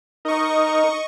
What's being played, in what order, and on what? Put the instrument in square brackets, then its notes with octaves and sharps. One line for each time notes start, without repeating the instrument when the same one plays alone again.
[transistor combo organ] D#4 A#4 [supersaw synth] D#5 C#6